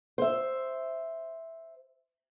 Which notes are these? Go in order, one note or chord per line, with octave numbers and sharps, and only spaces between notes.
C5 E5